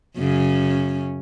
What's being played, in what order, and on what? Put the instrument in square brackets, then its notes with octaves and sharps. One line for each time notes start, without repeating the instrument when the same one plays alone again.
[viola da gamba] F#2 C#3 C#4